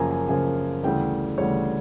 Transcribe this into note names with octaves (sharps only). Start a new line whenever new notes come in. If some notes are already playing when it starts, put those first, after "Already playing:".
Already playing: F#2 C#3 F3 A#3 G#5 A#5
G#5
F#2 C#3 F3 A#3 G#5
D2 C#3 E3 G3 G5
D2 C#3 E3 G3 C#5